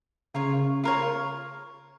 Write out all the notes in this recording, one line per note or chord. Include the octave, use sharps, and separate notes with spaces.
C#3 F4 A#4 C#5
F4 A#4 C#5